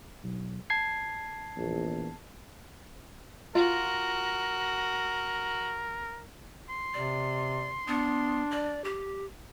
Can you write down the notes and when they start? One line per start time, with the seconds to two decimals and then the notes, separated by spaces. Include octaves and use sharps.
0.24 B1
0.70 A5 G#6 C7
1.57 A#1 E2
3.55 F4 F#4 A#4
6.70 C6
6.94 C3 D5
7.88 B3 D4
8.51 D5
8.84 G4